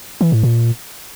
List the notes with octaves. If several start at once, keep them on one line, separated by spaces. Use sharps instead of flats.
E3
A2
A#2